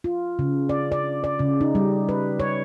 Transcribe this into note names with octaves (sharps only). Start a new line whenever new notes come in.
F4
C#3
D5
D5
D5
C#3
D#4
G3
B4
C#5